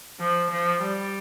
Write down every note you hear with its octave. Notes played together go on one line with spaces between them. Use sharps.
F3
F3
G3